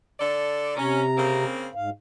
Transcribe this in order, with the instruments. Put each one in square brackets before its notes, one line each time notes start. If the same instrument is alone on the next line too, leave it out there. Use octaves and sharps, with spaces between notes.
[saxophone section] D3 A4 D5
[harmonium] C3 A#5 [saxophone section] C#4
[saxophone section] C#3 A#3 C4
[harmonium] G#2 F5